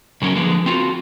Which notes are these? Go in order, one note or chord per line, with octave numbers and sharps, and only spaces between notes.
C#3 F#3 C#4 A#4
D3 F3 G#3 A#3 B4
C4 F4 F#4